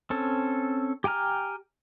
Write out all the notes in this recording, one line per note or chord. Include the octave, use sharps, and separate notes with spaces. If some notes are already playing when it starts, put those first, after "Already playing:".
C4 C#4 A4
G4 G5 G#5 A#5 F6